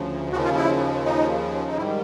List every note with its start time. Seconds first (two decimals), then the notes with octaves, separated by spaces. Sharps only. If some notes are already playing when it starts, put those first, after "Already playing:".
Already playing: D2 C#3 F3
0.32 D#2 C#3 F3 F#4
0.45 F4
0.56 E4
1.05 D#4
1.67 D#4
1.77 G#2 D#3 G3 E4